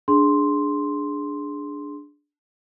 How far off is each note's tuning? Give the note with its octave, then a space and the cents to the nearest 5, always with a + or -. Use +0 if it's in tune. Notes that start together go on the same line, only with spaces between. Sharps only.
D4 +0 G#4 +0 C6 +0